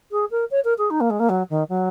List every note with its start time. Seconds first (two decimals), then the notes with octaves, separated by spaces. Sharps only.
0.11 G#4
0.31 A#4
0.51 C#5
0.64 A#4
0.78 G#4
0.90 D#4
1.00 A#3
1.10 G#3
1.19 A#3
1.29 F#3
1.50 D#3
1.69 F#3